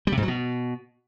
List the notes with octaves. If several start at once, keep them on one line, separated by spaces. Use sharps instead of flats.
G3
C3
G#2
F#3
B2